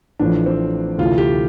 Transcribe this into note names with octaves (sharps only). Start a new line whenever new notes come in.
A1 A2 F3 A3 D4
C4
D2 C3 E3 A3 F4
G4